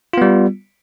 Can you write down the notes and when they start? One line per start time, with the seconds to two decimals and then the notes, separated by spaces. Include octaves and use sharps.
0.13 F4
0.18 B3
0.22 G3